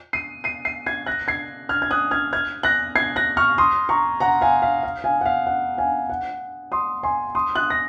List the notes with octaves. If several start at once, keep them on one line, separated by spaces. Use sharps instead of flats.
C7 D#7
C7 D#7
C7 D#7
G#6 C7
F#6 A#6
G#6 C7
F6 G#6
G#6
D#6 F#6
F6 G#6
F6 G#6
F#6 A#6
G#6 C7
F#6 A#6
C#6 F6
C6 D#6
A#5 C#6
F#5 A#5
F5 G#5
F5
F5
F5 G#5
F#5
F5
F#5
F5 G#5
F#5
C6 D#6
G#5 C6
C6 D#6
D#6 F#6
A#6